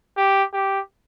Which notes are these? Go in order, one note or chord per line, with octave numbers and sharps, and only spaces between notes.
G4
G4